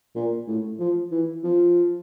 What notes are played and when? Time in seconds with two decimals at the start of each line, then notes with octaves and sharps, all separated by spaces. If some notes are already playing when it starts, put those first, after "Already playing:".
0.16 A#2
0.48 A2
0.79 F3
1.11 E3
1.44 F3